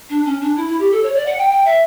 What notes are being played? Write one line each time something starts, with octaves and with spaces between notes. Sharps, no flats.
D4
C#4
D4
E4
E4
G4
A4
C#5
D5
F#5
G5
G5
E5